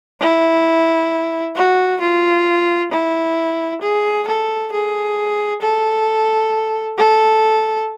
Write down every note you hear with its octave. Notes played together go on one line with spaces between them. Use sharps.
E4
F#4
F4
E4
G#4
A4
G#4
A4
A4